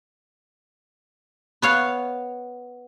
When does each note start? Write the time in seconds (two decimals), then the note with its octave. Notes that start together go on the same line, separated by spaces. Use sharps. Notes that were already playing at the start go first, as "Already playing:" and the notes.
1.62 B3 C#5 F5